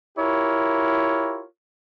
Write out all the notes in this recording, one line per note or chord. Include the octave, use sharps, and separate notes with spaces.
E4 F4 G4 A#4 C#5